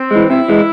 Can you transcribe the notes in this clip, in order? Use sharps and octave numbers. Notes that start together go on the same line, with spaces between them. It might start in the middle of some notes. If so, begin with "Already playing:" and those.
Already playing: C4
E3 G#3
C3 E4
E3 G#3